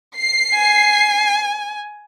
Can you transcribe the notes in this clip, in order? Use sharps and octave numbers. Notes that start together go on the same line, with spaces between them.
C7
G#5